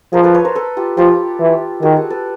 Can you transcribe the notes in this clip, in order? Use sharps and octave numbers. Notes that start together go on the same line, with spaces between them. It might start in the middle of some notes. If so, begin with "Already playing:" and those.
F3 G#4 A#4
A4 B4
B4 C#5
A#4 C5
A4 B4
F4 G4
F3 F4 G4
E3
D#3 F#4 G#4
G4 A4
A4 B4